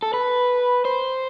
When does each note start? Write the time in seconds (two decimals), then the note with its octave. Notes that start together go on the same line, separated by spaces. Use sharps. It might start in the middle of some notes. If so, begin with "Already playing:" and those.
0.02 A4
0.13 B4
0.85 C5